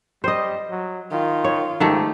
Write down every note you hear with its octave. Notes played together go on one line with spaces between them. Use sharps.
G3 C5 D#5
F#3
D#3 F4
C#5
G#2 D#3 A3 G4